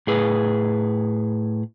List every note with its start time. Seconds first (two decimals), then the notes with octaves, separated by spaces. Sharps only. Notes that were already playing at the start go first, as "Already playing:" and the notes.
0.07 A2 G#4 B4